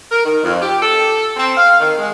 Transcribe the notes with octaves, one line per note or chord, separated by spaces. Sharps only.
A#4
D#3
F2
G4
A4
C4
F5
D#3
G#3